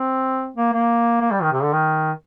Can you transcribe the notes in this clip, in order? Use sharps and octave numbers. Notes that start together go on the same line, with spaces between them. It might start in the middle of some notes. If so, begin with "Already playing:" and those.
Already playing: C4
A#3
A#3
A#3
G3
D#3
C3
D3
D#3